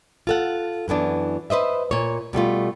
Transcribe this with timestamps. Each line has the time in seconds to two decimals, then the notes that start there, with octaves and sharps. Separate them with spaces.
0.27 F4 A4 F#5
0.88 F#2 E3 B3 D4
1.50 B4 C5 D#5 E5
1.91 A#2 C#5
2.33 B2 G3 A3 F4